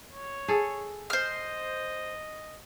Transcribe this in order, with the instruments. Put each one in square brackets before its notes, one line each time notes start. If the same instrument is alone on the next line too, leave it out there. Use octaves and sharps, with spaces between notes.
[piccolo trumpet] C#5
[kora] G#4 A4
[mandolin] C5 F6 [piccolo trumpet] D#5